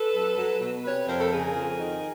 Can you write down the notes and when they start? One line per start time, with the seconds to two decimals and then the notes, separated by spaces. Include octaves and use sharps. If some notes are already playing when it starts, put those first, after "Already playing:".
Already playing: A4 B4
0.14 F#2
0.37 F#3
0.60 B2
0.84 C3 B4 C#5
1.07 F2 A#4 C5
1.21 A4
1.31 C#3 G#4 A#4
1.55 F2
1.78 D#3